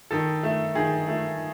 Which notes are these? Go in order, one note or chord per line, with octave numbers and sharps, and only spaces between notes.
D#3 A4
A3
D#3 G#4
A3